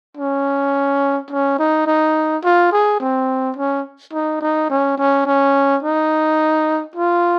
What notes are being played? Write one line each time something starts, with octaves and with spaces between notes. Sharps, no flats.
C#4
C#4
D#4
D#4
F4
G#4
C4
C#4
D#4
D#4
C#4
C#4
C#4
D#4
F4